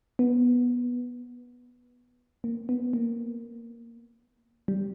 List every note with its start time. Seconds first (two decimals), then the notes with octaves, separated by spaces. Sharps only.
0.19 B3
2.44 A#3
2.69 B3
2.93 A#3
4.68 G3